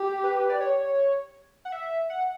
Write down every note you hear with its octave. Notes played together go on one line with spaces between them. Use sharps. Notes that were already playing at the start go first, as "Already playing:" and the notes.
Already playing: G4
B4
D5
C#5
F#5
E5
F#5